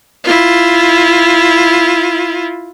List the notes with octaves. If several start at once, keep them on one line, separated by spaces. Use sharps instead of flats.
E4 F4